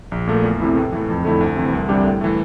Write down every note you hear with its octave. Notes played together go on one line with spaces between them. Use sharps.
A#1
A#2 A3
E2
C3 E3 A3 E4
A2
E3 A3
F2
D3 A3 E4
D2
C3 E3
C2
C3 G3 D4 G4
A2
E3 A3